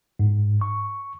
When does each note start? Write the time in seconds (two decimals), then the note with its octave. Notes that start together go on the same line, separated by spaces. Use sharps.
0.19 G#2
0.61 C#6